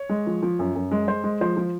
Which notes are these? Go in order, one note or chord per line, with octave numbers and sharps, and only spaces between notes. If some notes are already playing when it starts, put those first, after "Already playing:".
Already playing: C#5
G#3
F3
F3
F#2
F#2
G#3
G#3 C5
G#3
F3 C5
F3